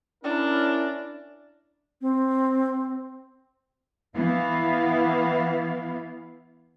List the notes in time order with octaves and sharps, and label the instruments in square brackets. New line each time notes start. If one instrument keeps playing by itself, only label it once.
[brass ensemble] C#4 E4 A#4 [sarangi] D4
[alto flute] C4
[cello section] E3 B3 E4 F5